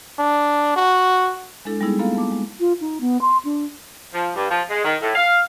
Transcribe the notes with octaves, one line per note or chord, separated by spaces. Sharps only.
D4
F#4
G#3 D4 E4 A4
G3 G#3 B3 D#4 E4 G#4
A#3 B3 F4 A4 F5
B3 A5 D6
G#3
F4
D#4
B3
C6
D4
F3
G2
F3
G#3
D#3
A2
F5